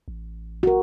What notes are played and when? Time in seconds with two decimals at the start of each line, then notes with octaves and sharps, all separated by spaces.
0.08 A1
0.63 A1 F#4 A#4